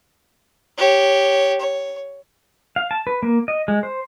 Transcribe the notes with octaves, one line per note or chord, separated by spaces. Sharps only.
G4 C#5
C#5
F5
A5
B4
A#3
D#5
G#3
C5